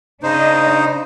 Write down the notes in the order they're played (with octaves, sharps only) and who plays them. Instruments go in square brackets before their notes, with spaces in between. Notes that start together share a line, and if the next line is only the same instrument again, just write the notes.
[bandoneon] C#3 D#4 C5 [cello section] D4 D#5